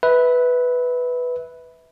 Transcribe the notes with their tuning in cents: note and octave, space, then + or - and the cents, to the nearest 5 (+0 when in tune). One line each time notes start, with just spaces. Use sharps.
B4 +0 E5 -25